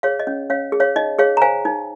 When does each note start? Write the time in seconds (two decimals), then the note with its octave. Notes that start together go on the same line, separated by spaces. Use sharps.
0.03 G#4 C#5 F5
0.20 D#5
0.27 C#4
0.50 C#4 C#5 F5
0.72 G#4
0.80 C#5 F5
0.96 D#4 D#5
1.19 G#4 C#5 F5
1.37 A#5
1.41 C5 F5 G#5
1.65 D#4